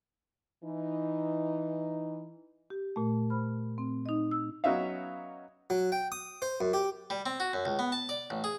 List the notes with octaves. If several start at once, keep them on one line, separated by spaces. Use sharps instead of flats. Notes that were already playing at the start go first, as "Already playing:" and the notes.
E3 D#4
G4
A#2 A3
C5 B5 F6
C4
D#4 D#5
E6
F#3 B3 C#4 D#4 E5 F5
F#3
G5
D#6
C5
F#2
G4
G3
C4
F#4
F#2
C#2
B3
A5
D5
A1
G#4